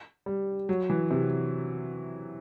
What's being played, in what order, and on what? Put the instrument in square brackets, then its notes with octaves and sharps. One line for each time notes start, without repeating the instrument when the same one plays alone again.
[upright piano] G3
F#3
E3
C3